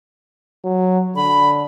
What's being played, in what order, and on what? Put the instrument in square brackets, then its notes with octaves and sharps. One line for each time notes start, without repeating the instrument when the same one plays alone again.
[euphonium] F#3
[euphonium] D3 [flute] B5